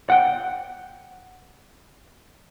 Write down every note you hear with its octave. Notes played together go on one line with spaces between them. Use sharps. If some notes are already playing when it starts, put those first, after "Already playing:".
F#5 G5